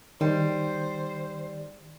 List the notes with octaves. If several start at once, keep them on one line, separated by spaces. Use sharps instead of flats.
D#3 G3 C5